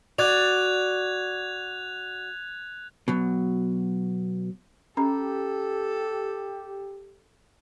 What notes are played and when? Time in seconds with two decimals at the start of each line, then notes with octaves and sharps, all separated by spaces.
0.18 F#4 D5 F#6 G#6 F7
3.08 B2 F#3
4.97 C#4 G4 A4 A#5